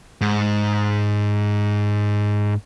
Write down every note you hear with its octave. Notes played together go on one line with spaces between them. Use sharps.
G#2